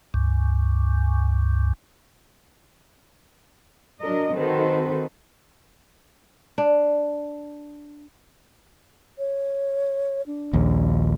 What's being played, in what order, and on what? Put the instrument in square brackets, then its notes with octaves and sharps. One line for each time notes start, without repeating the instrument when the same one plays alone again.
[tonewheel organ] C#2 G2
[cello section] F#3 D4 A#4 D#5
D#3 C4 F#4 A4 B4 C5
[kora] D4
[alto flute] C#5
D4
[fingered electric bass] A#1 D#2